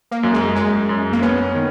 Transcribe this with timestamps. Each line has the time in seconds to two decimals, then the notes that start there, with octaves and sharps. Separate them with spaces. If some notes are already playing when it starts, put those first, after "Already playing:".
0.11 A#3
0.23 F#2
0.34 G#3
0.56 F#2 G#3
0.89 F#2
1.13 A#3
1.22 B3 C#4
1.55 D#3